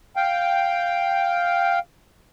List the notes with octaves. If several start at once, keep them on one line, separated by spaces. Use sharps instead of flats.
F5 G5